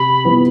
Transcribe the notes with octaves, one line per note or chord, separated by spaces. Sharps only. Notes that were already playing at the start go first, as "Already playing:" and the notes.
Already playing: C3 B5
F3 B3 E4